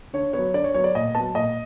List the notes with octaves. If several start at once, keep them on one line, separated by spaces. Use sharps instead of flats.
D3 C#5
F#3 B3 C#5
D3 D5
C#5
F#3 B3 C#5
D5
A#2 D#5
F#3 B3 A5
A#2 D#5